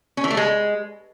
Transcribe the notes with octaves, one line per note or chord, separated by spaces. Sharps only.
C#4
E3
A3
G#3